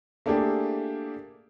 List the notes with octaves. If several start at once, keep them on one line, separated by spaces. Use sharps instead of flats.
A3 A#3 D4 E4 G4 G#4